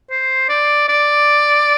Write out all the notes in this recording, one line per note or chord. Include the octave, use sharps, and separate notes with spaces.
C5
D5
D5